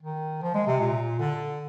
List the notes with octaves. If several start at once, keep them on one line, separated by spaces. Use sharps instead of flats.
D#3
F3
G#3
C3
A#2
D3